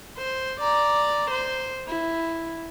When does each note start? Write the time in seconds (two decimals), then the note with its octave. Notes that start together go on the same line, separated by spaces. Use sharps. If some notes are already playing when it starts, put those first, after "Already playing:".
0.18 C5
0.60 D5 A#5
1.30 C5
1.88 E4